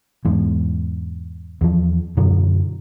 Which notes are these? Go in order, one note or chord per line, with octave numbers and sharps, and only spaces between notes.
E2 G#2
E2 F3
F#2 B2 D3 F#3